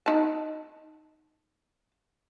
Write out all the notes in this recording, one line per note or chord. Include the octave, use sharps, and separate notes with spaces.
D#4 A5